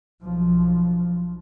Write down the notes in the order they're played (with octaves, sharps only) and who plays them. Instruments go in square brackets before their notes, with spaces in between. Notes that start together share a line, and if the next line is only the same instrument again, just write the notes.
[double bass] B1 F3